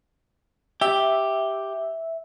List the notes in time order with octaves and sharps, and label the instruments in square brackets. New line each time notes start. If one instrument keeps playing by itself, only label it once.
[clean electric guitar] G4 [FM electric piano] E5